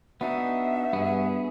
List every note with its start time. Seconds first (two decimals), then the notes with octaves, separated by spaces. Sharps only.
0.21 B3 D4 D#4 F#4 E5
0.93 G2 B3 G#4